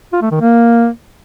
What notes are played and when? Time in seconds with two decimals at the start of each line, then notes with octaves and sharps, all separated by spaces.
0.13 F4
0.22 A3
0.31 D#3
0.41 A#3